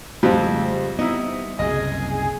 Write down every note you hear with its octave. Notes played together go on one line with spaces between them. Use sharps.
F2 G#2 C#3 G3 A3 C4
B3 D#4 E4
F#1 C2 G#4 D#5